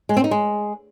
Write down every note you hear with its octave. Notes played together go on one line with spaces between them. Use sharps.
G#3
C4
D#4
G#3